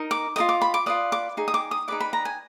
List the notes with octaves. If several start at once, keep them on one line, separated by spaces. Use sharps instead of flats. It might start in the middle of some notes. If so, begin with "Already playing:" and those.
Already playing: D#4 A#4 D#5
D6
F4 A#4 D#5 D#6
D6
B5
D6
F4 B4 D5 D#6
D6
D#4 G#4
D#6
D6
D#6
D#4 G#4 B4 D5 D6
B5
A#5
G#5